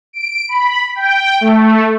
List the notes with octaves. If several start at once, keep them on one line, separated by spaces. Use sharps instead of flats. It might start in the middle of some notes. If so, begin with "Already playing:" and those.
D7
B5
G5
A3